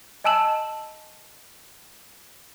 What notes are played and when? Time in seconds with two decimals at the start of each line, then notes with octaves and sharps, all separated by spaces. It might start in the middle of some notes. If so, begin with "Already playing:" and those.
0.24 D#5 G#5 A5 E6 E7 F#7